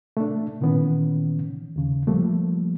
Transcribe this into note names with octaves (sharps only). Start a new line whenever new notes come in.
A3 D4
A#2 D#3 E3 B3 C#4
D#2 C#3
F3 G3 A3 A#3